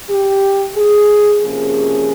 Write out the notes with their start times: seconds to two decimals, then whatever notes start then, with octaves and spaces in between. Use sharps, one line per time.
0.09 G4
0.76 G#4
1.42 C3 F3 A#3 C#4 G#4